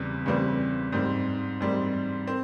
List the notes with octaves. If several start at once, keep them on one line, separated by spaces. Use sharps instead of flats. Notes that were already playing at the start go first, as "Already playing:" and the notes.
Already playing: E2 C#3 E3 G3 C4
E2 C#3 E3 G3 C4
G#2 G3 C4
G#2 G3 C4
C4